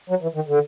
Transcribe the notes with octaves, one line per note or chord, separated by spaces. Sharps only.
F#3
E3
D#3
D3